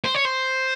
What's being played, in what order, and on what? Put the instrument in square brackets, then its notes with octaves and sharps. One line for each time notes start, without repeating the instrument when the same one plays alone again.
[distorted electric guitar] C5
C#5
C5